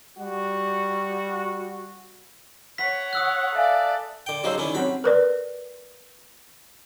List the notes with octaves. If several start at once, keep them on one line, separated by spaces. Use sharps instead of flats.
G3 F#4
C#5 F#5 B6
D#6 E6 F#6
A4 D5 E5 F5 G#5
D3 G5
C#3 F#3 D#4 G#4 C5 E6
D3 D#3 C#4 E4
F#3 C4 C#4 B5
A#4 B4 D5